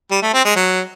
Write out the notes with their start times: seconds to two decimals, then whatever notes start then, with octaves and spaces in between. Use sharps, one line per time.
0.11 G3
0.22 A3
0.34 C4
0.45 G#3
0.56 F#3